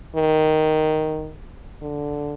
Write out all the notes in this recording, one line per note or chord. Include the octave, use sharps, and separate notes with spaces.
D#3
D3